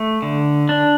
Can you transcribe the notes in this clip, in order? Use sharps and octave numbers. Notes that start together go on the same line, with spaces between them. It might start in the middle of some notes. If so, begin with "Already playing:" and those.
Already playing: A3
D3
D4